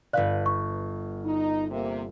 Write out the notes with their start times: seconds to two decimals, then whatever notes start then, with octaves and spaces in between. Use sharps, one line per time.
0.13 G1 B4 D5 F5 F#6
0.46 C#6
1.25 D#4
1.71 C3 A#3